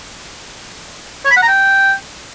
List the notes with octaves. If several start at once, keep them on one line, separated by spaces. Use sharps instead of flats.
C#5
B5
F#5
A#5
G5